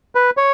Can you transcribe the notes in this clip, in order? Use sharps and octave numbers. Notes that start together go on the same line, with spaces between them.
B4
C#5